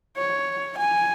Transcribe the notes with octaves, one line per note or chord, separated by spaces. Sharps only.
C#5
G#5